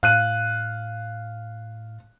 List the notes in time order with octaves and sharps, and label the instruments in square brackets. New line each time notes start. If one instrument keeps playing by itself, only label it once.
[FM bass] A2 [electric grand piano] F5 F#6 D#7